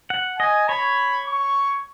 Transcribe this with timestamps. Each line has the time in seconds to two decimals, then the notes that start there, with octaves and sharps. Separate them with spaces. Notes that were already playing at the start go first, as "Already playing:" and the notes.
0.10 F#5
0.39 D#5 G#5
0.68 C#5 B5
1.27 C#6